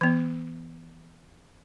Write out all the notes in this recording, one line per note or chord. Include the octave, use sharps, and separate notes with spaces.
E3 B3